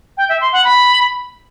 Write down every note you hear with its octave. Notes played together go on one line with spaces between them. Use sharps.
G5
E5
C6
F#5
B5